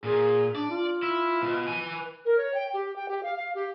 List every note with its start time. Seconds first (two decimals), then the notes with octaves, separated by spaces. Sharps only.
0.04 A#2 G#4
0.56 D4 D5
0.71 F4
1.03 E4
1.42 B2
1.68 B4 G#5
2.25 A#4
2.38 C#5
2.54 G5
2.74 G4
2.96 G5
3.09 G4
3.23 F5
3.37 F5
3.55 G4